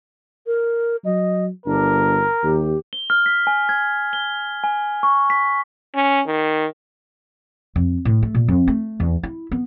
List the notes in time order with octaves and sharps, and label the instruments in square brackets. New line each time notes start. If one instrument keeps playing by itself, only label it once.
[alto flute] A#4
[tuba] F#3 [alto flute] D#5
[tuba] G1 [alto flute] D4 [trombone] A#4
[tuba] D#2 [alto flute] G4
[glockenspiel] G7
F6
B6
G#5
G#6
G7
G#5
C#6
B6
[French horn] C#4
D#3
[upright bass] F2
A2
A3
A#2
F2
A3
E2
E4
B3